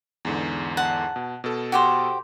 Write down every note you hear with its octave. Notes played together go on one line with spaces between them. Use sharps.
E2 G#2 D3
F#5 A5
B2
B2 A4
F#4 G4 C5